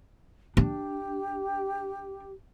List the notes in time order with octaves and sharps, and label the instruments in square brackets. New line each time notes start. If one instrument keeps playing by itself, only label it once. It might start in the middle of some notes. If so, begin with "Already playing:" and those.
[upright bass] D4 [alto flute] G4